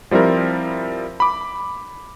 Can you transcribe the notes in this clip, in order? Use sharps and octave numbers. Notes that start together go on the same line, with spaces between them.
F3 G3 C4 E4 A#4
B5 D6